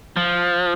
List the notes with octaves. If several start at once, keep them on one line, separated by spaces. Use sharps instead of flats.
F3